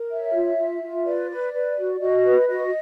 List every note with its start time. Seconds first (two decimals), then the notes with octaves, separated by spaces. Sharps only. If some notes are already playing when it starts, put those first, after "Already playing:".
Already playing: A#4
0.10 C#5 E5
0.34 F4
0.57 F4
0.82 F4
1.05 B4 D5
1.30 B4
1.53 B4
1.78 F#4
2.00 F#4 D#5
2.25 B4
2.48 F#4 D#5